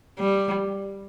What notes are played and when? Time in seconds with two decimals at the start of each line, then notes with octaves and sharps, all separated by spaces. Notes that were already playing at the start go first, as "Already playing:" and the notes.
0.19 G3